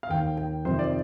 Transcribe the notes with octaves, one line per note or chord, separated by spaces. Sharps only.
F5
D#2 D#3 G5
G5
F2 C3 D#3 C5
D5